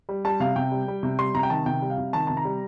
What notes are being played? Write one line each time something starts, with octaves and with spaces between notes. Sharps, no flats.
G3
G3 A5
C3 F5
C3 G5
G3
G3
C3
G3 C6
C3 A#5
G5
D#3 A5
C3 G5
G3
F5
C3
D#3 A5
C3 A5
A#5
G3